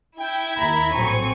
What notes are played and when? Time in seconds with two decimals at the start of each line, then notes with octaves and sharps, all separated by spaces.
0.19 E4 G5 G#6
0.57 D#2 A#3 A#5 B5
0.92 A#1 A2 F#3 C4 G#5 C#6